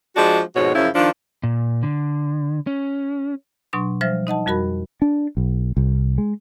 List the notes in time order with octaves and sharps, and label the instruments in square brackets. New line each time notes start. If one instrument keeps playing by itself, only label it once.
[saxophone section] F3 G#3 D4 F#4
F2 G#2 B2 F#4 C#5
F#2 C#3 F3 C#4 E4
D#3 F3 D4
[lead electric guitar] A#2
D3
C#4
[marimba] B2 F#3 D4 C6 C#6
F3 G3 C5 E5 F6 A#6
D#4 D#5 F#5 A5
F2 G3 F#4 A#4 B5
[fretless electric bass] D4
B1
C2
G#3